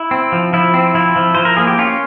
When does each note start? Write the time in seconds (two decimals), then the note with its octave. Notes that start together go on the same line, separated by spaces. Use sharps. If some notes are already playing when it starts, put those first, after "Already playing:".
Already playing: E4
0.11 C4
0.32 F3
0.53 F3 E4
0.74 C4
0.94 F3 E4
1.16 F3
1.35 F3 C5
1.45 A#4
1.57 A#3 G#4
1.67 G4
1.78 C#4 F4